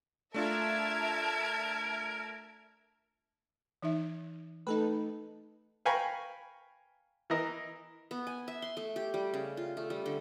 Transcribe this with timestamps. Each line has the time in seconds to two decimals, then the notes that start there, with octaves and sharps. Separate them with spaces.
0.34 A3 D4 F4 A#4 E5 A5 G#6
3.82 E3 D#4 E5
4.67 A3 D#4 A4 B4
5.86 F5 G5 G#5 A#5 B5 C#6
7.30 E3 E4 A#4 D#5
8.11 B3
8.27 G#5
8.48 E5
8.62 C6
8.77 A3
8.96 G4
9.14 G3
9.34 C#3
9.57 F4
9.77 A3
9.90 G3
10.06 D3